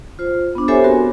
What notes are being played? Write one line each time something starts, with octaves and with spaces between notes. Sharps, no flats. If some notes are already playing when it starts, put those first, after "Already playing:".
F4 C5
B3 D4
G4 A4 C5 C#5 E5 G#5
B3 C4 F#4 A#4